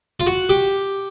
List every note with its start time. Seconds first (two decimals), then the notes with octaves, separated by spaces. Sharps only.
0.20 F4
0.27 F#4
0.49 G4